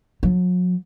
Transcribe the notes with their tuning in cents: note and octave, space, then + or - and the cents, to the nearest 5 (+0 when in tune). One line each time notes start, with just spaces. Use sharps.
F#3 -40